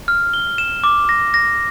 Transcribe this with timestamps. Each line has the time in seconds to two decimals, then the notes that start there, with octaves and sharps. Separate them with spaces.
0.08 F6
0.34 G7
0.58 E7
0.84 D6
1.09 A#6
1.34 A#6